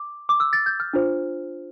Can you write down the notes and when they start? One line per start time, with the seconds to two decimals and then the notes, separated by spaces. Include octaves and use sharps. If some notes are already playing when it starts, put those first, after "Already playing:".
Already playing: D6
0.29 D6
0.40 E6
0.53 A6
0.66 G6
0.80 F6
0.93 D4 F4 C5